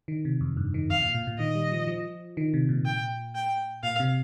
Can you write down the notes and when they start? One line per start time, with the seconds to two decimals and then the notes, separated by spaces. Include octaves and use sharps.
0.08 D#3
0.25 C3
0.41 F2
0.57 G2
0.74 D#3
0.90 F2 F5
1.02 A#2
1.15 A#2
1.27 A#2
1.39 D#3 D#5
1.55 G3
1.72 F3
1.87 F3
2.37 D#3
2.54 C3
2.69 A#2
2.86 G5
3.35 G5
3.83 A#2 F5
4.00 C3